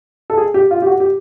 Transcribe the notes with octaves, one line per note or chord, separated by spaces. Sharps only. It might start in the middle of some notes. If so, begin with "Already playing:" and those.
A4
G#4
G4
F4
G4
F#4
G4